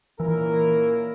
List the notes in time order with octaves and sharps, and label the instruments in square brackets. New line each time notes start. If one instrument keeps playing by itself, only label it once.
[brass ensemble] A#2 A#3 C#4 E4 A#4 [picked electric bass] E3